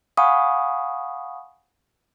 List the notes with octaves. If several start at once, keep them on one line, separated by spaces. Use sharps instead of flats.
F5 F#5 G#5 B5 C#6 D#6